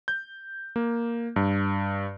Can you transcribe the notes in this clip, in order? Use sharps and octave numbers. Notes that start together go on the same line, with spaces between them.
G6
A#3
G2